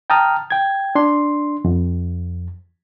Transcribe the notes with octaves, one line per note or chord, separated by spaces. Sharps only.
G5 A5 A#5 D#6 F6
G5 G#6
D4 C6
F2